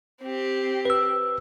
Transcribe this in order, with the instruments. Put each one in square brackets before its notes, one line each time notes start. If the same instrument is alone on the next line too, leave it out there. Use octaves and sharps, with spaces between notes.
[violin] C4 G4
[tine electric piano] B4 E6